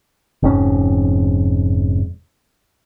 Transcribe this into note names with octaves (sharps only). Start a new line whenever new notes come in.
F1 F2 G#2 C#4